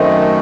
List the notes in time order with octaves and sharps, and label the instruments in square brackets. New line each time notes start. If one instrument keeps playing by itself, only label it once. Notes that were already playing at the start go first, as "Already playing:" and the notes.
Already playing: [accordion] F#2 D#3 A3 [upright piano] C4 D#4